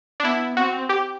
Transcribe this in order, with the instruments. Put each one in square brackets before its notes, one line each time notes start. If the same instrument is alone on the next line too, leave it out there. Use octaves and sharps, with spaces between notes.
[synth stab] D4
[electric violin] B3 [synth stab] E4
[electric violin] C4 [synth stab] F#4
[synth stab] G4